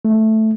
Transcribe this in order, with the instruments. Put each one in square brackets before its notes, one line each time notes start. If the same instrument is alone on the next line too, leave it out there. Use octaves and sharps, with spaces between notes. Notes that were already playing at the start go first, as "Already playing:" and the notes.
[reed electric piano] A3